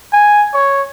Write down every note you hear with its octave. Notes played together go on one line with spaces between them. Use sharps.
G#5
C#5